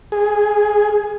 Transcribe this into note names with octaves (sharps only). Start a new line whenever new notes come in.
G#4